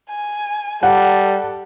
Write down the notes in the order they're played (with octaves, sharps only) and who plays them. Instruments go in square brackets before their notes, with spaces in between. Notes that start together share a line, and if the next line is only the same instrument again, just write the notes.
[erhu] G#5
[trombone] G3 [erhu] A4 [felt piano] F#5